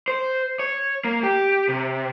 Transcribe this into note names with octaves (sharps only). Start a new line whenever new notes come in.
C5
C#5
A#3
G4
C3